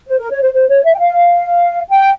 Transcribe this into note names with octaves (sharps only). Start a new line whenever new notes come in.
C5
A#4
C#5
C5
C5
C#5
E5
G5
F5
G5